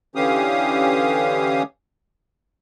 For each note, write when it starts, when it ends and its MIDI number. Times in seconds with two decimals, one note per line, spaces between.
0.16 1.63 50
0.16 1.63 52
0.16 1.63 61
0.16 1.63 67
0.16 1.63 77
0.16 1.63 87